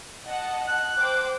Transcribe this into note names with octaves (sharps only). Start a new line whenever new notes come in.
D#5 F#5 A5
F#6
C5 G5 D6